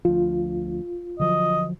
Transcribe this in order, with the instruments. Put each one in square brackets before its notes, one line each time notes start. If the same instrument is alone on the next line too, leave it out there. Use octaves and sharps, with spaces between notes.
[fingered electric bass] D2 F3 [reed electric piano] F4
[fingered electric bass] D3 F3 F#3 [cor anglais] D#5